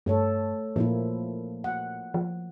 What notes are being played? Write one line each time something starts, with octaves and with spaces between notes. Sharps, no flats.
G2 A3 A4 C#5
A#2 F3 A#3 E4
F#5
F3